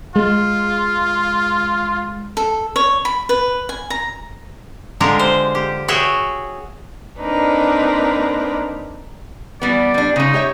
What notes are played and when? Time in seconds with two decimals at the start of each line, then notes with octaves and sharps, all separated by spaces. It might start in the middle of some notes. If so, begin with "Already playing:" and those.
0.16 G#3 F4
2.37 A4
2.76 C#5
3.05 B5
3.29 B4
3.69 G#5
3.90 A#5
5.00 D3 G#3 F4 G4 G#4 A#4
5.19 C5
5.55 G4
5.88 F#4 G#4 C#5 E5 G5
7.20 A#3 C4 D4 D#4 A#4 B4
9.62 E3 G3 B3 D5
9.94 G3 D4
10.16 C#3 G#3 D#4
10.34 G4 C#5 E5